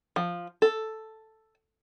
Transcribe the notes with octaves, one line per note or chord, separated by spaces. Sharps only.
F3
A4